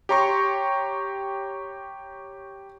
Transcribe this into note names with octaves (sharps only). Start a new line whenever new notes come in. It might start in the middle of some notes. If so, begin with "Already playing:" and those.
G4 C#5 A#5 C6 C#6